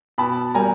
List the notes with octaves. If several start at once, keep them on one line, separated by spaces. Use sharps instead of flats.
B2 A5 B5
G3 A#3 G#5 A#5